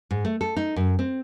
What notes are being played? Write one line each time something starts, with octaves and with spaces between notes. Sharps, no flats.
G#2
A3
A4
D#4
F#2
C4